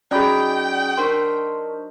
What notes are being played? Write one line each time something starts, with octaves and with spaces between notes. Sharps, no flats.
F#3 C#4 D#4 G#4 D5 G5 B5
D4 A#4 C5 C6 C#6